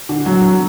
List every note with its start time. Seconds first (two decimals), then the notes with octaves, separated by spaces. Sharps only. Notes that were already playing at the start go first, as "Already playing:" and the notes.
0.09 D3
0.26 F#3
0.40 F#3